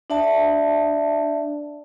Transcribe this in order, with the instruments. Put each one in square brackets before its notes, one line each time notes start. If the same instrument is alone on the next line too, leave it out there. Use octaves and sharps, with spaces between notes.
[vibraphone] D4 D5 E5 A5